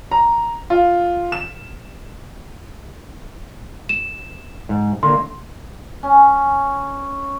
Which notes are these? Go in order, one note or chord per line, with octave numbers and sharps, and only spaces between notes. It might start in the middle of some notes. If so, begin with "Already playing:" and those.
A#5
F4
E7
E7
G#2
D3 A#3 C6
C#4